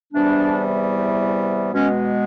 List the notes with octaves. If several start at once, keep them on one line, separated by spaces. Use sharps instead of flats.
E2 C3 E3 G3 B3 D4
B2 G#3 B3 C#4